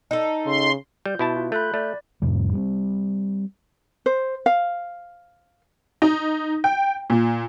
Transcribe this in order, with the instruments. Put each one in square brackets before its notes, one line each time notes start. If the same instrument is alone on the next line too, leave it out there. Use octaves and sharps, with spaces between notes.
[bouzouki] D#4 A4
[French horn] C#3 [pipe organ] C6
[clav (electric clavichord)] G3 [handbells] G6
[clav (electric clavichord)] B2 E4 A5
[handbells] F4
[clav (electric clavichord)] A3 [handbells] B5 F#6 G6
[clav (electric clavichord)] A3 [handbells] D5
[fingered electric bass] F2 A2 C3 G3
G3 B3 C4
[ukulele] C5
F5
[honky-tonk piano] D#4
G5
A#2